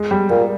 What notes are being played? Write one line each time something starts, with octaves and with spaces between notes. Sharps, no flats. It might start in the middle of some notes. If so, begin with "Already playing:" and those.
Already playing: G#3
G3
A#2 G3